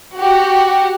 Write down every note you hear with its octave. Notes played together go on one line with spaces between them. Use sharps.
F#4 G4